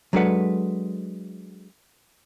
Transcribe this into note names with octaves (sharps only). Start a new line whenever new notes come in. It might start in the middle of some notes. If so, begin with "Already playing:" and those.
F#3 G#3 D4 A4 B4 F#5